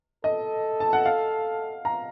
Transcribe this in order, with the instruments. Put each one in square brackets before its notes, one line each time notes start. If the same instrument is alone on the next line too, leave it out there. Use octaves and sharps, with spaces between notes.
[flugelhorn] A4 [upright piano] D#5
[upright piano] A5
F#5
F5
A#5